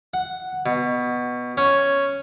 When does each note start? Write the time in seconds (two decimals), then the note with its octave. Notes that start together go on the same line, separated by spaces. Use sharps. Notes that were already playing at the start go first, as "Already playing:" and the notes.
0.14 F#5
0.66 B2
1.57 C#4